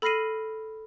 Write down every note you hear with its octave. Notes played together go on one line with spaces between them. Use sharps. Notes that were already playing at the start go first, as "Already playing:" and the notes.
A4 B5 F6 A#6 C7 D#7